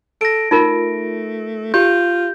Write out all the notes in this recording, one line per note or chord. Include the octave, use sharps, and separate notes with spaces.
A4 A#6 D7
A3 D#4 F4 A#4
F4 G4 G6